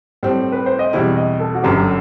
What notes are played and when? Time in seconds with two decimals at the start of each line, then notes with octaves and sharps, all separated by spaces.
0.23 A2 G3 C4 C5
0.52 B4
0.66 C5
0.79 D#5
0.93 E2 B2 G3 C4 E4 E5
1.16 D#5
1.40 A4
1.55 F#4
1.63 G1 F#2 F#3 G4